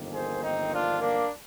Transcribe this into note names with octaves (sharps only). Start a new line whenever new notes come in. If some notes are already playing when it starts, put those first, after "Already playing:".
Already playing: G1 F2 D#3 A#3
G#4 C5
C4 D#4
D4 F4
A#3 D4